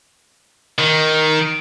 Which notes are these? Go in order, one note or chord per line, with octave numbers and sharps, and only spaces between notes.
D#3